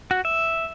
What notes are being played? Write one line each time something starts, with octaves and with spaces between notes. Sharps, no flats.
F#4
E5